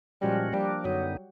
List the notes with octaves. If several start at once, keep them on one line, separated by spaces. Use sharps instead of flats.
A#2 F3 G3 G#3 C#4 F#4
F3 G3 A#3 D4
F#2 D3 F#3 G3 B3 D#4